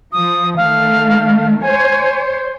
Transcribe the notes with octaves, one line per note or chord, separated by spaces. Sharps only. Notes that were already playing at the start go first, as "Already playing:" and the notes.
F3 D#6
D#3 A3 F5
C5 C#5 G#5